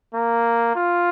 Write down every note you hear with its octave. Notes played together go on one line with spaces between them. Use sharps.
A#3
F4